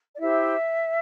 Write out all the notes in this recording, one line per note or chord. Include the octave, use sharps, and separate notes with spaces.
D5
E4 G4 C5 E5